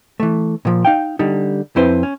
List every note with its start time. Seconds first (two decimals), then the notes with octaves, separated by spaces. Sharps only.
0.20 E3 A3
0.65 A#2 F3
0.85 D#4 F5 G5
1.19 D3 G3 D#4
1.76 F2 C4 E4 B4 C5
2.03 C#4